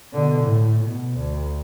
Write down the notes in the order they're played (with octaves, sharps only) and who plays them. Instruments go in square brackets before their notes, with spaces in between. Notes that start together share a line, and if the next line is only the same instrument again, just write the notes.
[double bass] B2 D3
A2
B2
D2